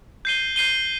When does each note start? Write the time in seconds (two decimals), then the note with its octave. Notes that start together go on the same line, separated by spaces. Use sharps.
0.25 G6 C7 D#7 G7
0.56 G6 C7 D#7 G7